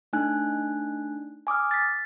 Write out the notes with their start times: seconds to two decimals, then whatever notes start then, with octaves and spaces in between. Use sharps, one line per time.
0.13 A3 D4 D#4 G#5 F#6
1.47 G#5 D6 D#6 F6
1.71 A6 B6